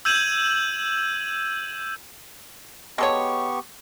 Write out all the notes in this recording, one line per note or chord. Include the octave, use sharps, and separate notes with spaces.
E6 G6 G#6 D#7 E7 F#7
G#3 B3 G4 A4 C#5 C#6